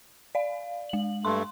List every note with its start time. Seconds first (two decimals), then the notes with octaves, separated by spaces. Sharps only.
0.35 D5 F5
0.89 G#3 F#7
1.25 G2 A3 C6